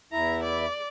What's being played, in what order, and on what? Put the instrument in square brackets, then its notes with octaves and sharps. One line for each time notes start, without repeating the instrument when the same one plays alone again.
[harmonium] E2 E4 E5 [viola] A#5
[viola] D5